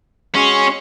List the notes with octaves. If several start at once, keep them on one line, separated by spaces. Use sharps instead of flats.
G#3 C#4 F#4 C6